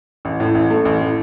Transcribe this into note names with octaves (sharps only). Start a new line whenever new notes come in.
A1
A2
A1
A3
A1
A2